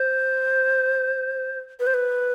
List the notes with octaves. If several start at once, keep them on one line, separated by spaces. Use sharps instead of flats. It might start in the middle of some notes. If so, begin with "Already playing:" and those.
Already playing: C5
B4
C5
B4